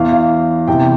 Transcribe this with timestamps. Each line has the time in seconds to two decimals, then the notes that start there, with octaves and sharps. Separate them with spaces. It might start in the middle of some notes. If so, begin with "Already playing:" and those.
Already playing: E2 E3 F5
0.12 F5
0.68 E2 C3 E3 G5